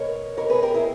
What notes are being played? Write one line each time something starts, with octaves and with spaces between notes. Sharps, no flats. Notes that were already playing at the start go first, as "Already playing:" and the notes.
Already playing: B2 A#4 C#5
B2 A#4 C#5
G#4 B4
G4 A#4
E4 G#4